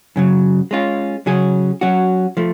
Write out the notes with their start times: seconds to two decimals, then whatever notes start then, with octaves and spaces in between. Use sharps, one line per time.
0.16 F#2 C#3 F#3
0.71 G#3 C#4 F4
1.26 C#3 F#3 C#4 G#4
1.81 F#3 C#4 F#4
2.37 F3 A3